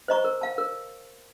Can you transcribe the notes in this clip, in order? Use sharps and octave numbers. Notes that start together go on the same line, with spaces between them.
C5 D#5 A#5 C#6
A#4
F5 A5
A#4